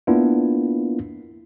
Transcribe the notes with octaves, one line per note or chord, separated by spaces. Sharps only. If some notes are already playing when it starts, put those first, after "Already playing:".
A#3 B3 D4 E4 F4